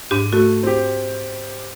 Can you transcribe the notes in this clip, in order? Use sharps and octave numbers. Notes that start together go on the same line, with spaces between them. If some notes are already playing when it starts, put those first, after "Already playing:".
G#2 D4 G4 D#7
A3 F#4
C4 G4